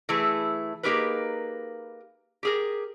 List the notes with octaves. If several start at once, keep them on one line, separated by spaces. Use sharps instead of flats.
E3 A3 E4 G#4 B4
A#3 D#4 G4 G#4 A#4 B4
G4 G#4 A#4